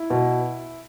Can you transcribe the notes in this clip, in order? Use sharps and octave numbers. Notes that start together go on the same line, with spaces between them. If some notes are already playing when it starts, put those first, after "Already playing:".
Already playing: E4
B2